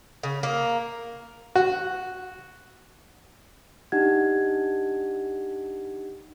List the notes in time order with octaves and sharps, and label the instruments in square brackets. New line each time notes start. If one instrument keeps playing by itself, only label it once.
[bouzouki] C#3
A#3
[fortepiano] F#4
[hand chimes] D4 D#4 G4 F#5 G#6